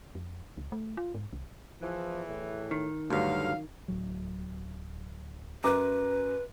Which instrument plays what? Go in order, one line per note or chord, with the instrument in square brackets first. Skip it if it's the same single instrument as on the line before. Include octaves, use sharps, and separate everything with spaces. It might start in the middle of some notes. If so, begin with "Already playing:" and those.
[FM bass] F2
C#2
A3
F4
G#2
C2
[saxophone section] E2 E3 [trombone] F3
[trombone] A2
[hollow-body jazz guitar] D#3
[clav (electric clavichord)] D2 G2 [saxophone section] D3 A#4 F5 [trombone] F#3
[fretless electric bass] D1 F#3
[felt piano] F#2 A#5 D6 [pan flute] B4